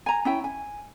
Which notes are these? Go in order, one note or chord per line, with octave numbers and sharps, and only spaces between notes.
G#5 A#5
C#4 E4 G5
G#5